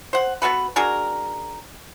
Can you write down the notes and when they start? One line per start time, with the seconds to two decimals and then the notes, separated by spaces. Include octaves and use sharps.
0.13 C5 F#5
0.42 B3 F#4 A4 B4
0.76 D4 F#4 G#4 A#4